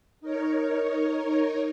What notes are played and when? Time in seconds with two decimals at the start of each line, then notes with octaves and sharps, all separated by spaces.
0.21 D#4 A#4 C#5